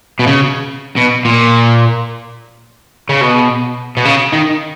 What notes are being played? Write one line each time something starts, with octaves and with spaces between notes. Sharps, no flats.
B2
C#3
B2
A#2
C#3
B2
B2
C#3
D#3